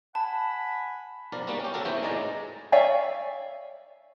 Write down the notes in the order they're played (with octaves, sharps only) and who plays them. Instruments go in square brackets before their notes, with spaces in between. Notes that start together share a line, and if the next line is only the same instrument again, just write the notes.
[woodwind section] F#5 G#5 B5 [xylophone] A5
[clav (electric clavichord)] B1 F3 A#4 D5
G3 A#3 B3 F#4
C#4 G4
C#3 F#3 F#4 A4 A#4
D#2 E3 B3 C4 C#5 G5
A2 G#3 D#4 D5 G#5 A#5
[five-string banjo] C#5 D5 E5 F5 G#5